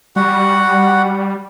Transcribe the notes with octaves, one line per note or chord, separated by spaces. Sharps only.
G3 F#4 F#5